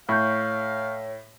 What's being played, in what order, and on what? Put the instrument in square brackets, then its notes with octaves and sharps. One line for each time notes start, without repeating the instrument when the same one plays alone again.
[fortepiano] A2 [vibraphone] C#5 [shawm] F5 [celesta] C#6 G6